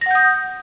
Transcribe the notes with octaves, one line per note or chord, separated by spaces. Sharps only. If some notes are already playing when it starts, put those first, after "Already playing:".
F#5 D#6 G6 A#6